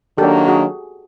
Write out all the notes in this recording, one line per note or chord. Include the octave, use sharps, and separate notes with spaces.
D#3 F#3 A#3 D4 G4 A4
F#4 G#4